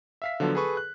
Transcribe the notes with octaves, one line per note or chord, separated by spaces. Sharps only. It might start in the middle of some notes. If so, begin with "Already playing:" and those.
E5 F5 B6
D3 F3 F#3 B3 A4
G#4 A4 B4 C#6
F#6